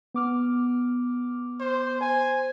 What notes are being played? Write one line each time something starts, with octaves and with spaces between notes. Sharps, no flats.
B3 D6 F6
C5
C5 G#5